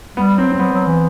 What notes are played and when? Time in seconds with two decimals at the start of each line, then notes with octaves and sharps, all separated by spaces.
0.17 G3 B3
0.38 F#3 C4
0.52 C4
0.59 F#3 B3
0.73 F#3
0.87 E3